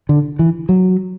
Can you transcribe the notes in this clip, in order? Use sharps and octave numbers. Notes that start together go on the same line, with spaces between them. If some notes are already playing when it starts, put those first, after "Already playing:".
D3
E3
F#3